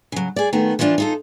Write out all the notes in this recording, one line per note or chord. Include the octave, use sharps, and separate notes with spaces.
C#3 F#3
G#4 D5
D#3 A3 B3
E3 F3 B3 D4 F4
D#4 F4 A4